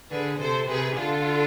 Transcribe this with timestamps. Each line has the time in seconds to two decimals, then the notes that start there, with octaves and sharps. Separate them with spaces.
0.10 D3 G#4 B4
0.39 C3 A4 C5
0.68 C3 G#4 B4
0.97 D3 F4 A4